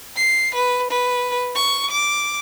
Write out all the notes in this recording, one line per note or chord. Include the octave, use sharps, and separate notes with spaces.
C7
B4
B4
C#6
D6